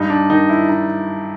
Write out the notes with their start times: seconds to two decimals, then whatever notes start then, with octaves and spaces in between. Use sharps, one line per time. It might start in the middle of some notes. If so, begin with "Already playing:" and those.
Already playing: G2 D#4
0.10 D4
0.30 D#3 D#4
0.49 E4
0.69 D#4